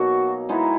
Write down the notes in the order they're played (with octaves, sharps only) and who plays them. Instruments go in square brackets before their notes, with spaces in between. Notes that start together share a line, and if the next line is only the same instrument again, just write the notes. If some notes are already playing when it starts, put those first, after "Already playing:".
Already playing: [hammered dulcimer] B2 F#3 A#3 D#4 [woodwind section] F#4
[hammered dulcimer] G#3 B3 D#4 F#4 [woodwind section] E4